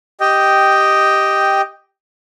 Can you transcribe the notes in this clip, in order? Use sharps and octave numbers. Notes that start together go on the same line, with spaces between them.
G4 D#5 G5